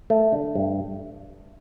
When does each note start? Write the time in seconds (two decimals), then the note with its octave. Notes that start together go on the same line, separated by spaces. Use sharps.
0.10 A3
0.32 D3
0.55 G2